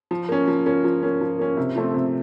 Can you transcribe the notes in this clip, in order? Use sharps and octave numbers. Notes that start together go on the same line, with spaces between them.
F3
A#3 C#4
F3
A#3 C#4
F3
A#3 C#4
F3
A#3 C#4
C3
F3 A3 C4
C3